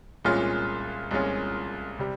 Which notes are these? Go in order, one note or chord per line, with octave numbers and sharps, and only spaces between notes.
C2 A#2 G#3 C#4 F4
C2 A#2 G#3 C#4 F4
C3 G3